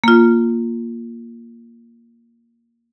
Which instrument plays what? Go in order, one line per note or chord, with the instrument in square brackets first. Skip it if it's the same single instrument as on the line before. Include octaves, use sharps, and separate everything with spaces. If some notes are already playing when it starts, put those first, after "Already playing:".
[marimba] A#3 F4